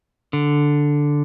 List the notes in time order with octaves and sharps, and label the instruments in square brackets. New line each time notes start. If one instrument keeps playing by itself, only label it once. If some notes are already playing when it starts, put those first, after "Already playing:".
[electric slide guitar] D3